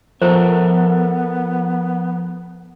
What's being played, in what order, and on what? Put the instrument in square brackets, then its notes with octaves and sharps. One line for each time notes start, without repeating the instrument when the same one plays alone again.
[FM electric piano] F3 [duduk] B3 [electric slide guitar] A4 A#4 E5 [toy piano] C5